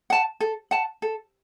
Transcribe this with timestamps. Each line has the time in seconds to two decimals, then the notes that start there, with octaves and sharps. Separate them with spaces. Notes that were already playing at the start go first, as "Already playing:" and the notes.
0.10 F#5 A5
0.40 A4
0.71 F#5 A5
1.02 A4